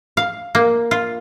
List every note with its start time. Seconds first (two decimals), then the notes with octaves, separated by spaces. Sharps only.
0.17 F5
0.55 A#3
0.91 F4